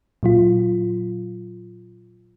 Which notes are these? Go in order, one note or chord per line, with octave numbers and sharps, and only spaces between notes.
A#2 F#3 F4